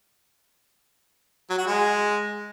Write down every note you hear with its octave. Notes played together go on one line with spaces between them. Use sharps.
F#3
F#4
G#3